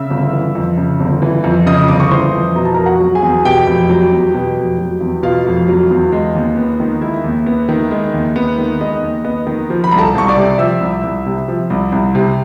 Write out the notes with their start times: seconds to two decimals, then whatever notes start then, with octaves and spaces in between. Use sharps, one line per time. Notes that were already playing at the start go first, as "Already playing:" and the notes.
Already playing: C#3 E5 E6
0.10 G1
0.33 E3
0.55 F2
0.77 C#3
1.00 G1
1.22 E3
1.44 F2
1.66 C#3 D#5 D#6
1.88 G1 D6
2.00 C#6
2.11 E3 C5 C6
2.33 F2
2.55 B2 A#5
2.65 A5
2.74 F1 A#4 A#5
2.86 F#4 F#5
3.00 F#3
3.15 G#4 G#5
3.22 E2
3.45 B2 G4 G5
3.67 F1
3.90 F#3
4.12 E2
4.34 B2
4.57 F1
4.78 F#3
5.01 E2
5.23 B2 F4 F5
5.46 F1
5.68 F#3
5.91 E2
6.12 G#3
6.35 D#2
6.57 B3
6.80 D#3
7.01 G#3 E4 E5
7.24 D#2
7.46 B3
7.69 D#3
7.91 G#3
8.14 D#2
8.36 B3
8.58 D#3
8.80 G#3 D#5
9.02 D#2
9.24 B3 D#5
9.47 D#3
9.70 F3
9.84 B5
9.91 C2 A#5
9.99 A4 A5
10.15 C2 C#6
10.28 D5 D6
10.37 C3
10.58 F3 E5 E6
10.81 C2
11.03 C2
11.26 C3
11.48 F3
11.70 C2
11.92 C2
12.15 C3